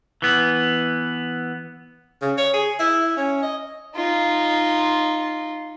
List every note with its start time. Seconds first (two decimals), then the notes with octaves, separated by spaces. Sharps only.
0.22 E3 B3
2.21 C#3
2.38 C#5
2.54 G#4
2.79 E4
3.17 C#4
3.43 D#5
3.95 D#4 F4